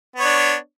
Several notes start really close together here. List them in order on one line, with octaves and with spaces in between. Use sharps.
B3 C#5 D4